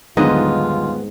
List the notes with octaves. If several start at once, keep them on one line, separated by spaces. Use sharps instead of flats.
D#1 B1 G#2 D3 B3 F4 D#5